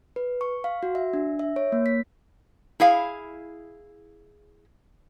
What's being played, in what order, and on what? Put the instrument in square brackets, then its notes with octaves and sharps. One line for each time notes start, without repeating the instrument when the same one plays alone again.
[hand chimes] B4
C#6
F5
F#4
E5
D4
E5
C#5
A#3
B6
[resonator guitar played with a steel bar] E4 G#4 F5